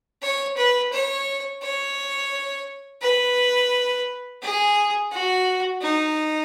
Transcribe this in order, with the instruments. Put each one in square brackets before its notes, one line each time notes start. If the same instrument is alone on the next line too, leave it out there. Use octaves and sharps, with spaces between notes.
[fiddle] C#5
B4
C#5
C#5
B4
G#4
F#4
D#4